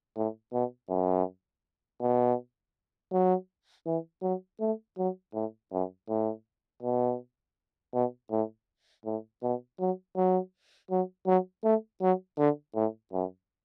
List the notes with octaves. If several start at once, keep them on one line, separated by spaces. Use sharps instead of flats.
A2
B2
F#2
B2
F#3
E3
F#3
A3
F#3
A2
F#2
A2
B2
B2
A2
A2
B2
F#3
F#3
F#3
F#3
A3
F#3
D3
A2
F#2